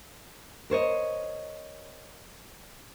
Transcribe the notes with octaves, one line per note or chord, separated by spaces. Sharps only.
A#4 C5 C#5 D#5